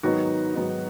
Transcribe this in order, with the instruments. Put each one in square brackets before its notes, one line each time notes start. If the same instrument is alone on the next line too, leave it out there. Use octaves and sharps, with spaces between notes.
[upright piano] G#2 D#3 F#3 B3 D#4 F#4
G#2 D#3 F#3 B3 D#4